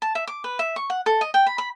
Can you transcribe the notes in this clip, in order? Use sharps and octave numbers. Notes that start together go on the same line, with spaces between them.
A5
E5
D6
B4
E5
C#6
F#5
A4
D#5
G5
B5
B5